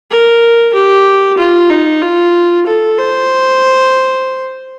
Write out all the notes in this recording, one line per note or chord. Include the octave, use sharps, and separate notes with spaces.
A#4
G4
F4
D#4
F4
A4
C5